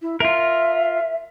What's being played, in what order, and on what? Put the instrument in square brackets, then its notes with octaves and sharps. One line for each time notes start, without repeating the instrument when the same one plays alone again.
[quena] E4
[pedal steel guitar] F4 A#4 [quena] E5